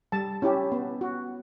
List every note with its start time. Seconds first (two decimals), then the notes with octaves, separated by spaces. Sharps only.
0.12 G3 A5
0.42 C#4 E4 G4
0.72 B3
1.01 F#4